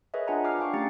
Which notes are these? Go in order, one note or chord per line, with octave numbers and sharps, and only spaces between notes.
G#4 A#4 B4 C#5 D#5 E5
D4 F4 G#4 F#5 G#5 A#5
D6 F6 C7
D4 F5 G5 C#6
A3 C#4 G4 A#5 A6 C#7